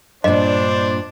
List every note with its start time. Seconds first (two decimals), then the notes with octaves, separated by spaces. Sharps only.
0.24 G2 A#2 D4 C5 D#5